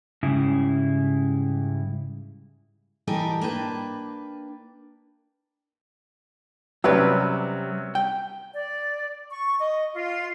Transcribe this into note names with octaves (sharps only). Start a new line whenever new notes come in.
G#2 C#3 G3 E4
E3 G3 G4 A4 A#4 D#5
A#3 D4 B4 G5
C3 F#3 G3 C#4 G4 B4
G5
D5
C#6
D#5
F4